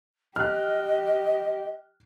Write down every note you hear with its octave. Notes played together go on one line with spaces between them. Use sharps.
G4 D#5 F6 F#6